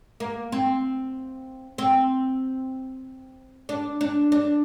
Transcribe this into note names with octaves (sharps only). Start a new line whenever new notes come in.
A#3
C4
C4
D4
D4
D4